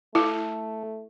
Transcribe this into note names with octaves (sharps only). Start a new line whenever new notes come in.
A3 E4 A4